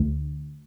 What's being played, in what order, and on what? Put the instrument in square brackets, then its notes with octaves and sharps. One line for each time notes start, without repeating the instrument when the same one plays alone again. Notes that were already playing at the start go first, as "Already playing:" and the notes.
Already playing: [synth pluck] D2